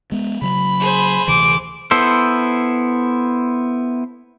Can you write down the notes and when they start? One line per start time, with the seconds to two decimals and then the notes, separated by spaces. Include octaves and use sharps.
0.12 G#3 B3
0.42 C#3 F#3 B5
0.80 G#4 C5
1.28 D2 C3 E3 D6
1.91 B3 E4 A4 C5